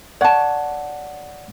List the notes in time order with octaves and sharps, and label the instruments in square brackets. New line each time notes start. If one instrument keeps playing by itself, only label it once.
[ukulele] C#5 A5 [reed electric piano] D5 F#5